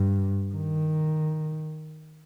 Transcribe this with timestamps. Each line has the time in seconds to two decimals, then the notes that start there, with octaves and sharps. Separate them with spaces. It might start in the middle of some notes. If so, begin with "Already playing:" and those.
Already playing: G2
0.54 D#3